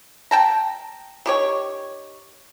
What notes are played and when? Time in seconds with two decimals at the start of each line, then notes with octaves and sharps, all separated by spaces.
0.31 G5 A5 A#5
1.26 D#3 G4 C#5